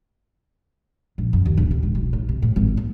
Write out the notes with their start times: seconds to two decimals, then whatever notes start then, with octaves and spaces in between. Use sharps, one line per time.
1.18 A#1
1.33 F#2
1.45 D#2
1.57 D1
1.71 C3
1.83 E1
1.95 B1
2.13 A2
2.29 C3
2.42 A2
2.56 G#1
2.77 A#3